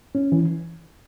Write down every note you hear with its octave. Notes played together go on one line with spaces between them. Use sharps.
C#4
E3